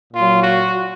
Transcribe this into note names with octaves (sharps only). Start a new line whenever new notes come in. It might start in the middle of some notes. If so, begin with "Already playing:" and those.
A#2 F#3 F4
F#4